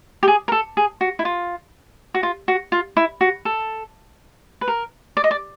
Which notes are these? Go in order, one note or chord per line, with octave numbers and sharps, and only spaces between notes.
G4
G#4
A#4
A4
G#4
F#4
E4
F4
F#4
F4
F#4
F4
E4
F#4
A4
B4
A#4
D5
D#5
D5